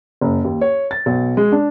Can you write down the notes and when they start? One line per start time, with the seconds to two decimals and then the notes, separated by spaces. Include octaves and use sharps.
0.21 F#1
0.45 D#2
0.61 C#5
0.91 A6
1.06 B1
1.37 G#3
1.52 D4